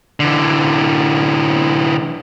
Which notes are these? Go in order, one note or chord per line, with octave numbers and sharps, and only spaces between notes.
D3 E3